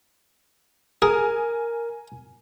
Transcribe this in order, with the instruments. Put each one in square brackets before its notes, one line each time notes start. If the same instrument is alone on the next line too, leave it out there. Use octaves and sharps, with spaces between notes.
[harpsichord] G#4 [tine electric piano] A#4 [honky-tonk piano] G#5